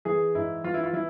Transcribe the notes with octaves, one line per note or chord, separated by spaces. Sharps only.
E3 G#4
G#2 E4
E3 F4
E4
F4
E3 E4